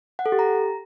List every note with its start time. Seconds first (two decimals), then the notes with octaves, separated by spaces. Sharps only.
0.19 F#5
0.26 A4
0.32 G4
0.39 A#5